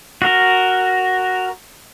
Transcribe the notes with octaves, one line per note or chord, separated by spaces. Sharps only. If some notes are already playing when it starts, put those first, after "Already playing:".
F#4 A#4